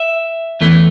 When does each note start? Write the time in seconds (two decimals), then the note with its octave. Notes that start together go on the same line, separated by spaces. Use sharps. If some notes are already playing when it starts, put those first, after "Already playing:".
Already playing: E5
0.61 E2 E3 A3